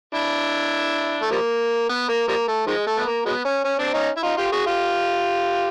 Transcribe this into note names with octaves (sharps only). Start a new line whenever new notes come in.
D4 E4
A3
F3 G3 A#3
B3
A#3
F3 G3 A#3
A3
D#3 F3 G#3
A3
B3
A#3
F#3 G#3 B3
C#4
C#4
C4 D4
C#4 D#4
E4
D#4 F4
F4 G4
F#4 G#4
F4 G4